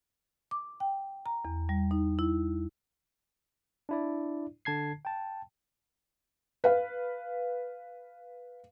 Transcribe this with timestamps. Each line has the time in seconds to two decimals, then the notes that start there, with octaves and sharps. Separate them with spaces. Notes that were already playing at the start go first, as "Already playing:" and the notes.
0.51 D6
0.80 G5
1.26 A#5
1.45 E2
1.69 G3
1.91 D#4
2.19 E4
3.89 D4 E4 D5
4.65 D3 A5 G#6 C7
5.05 G5 A5
6.64 B4 F5